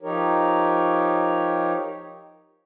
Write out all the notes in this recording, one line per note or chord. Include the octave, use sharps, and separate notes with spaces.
F3 D#4 G4 A#4 C#5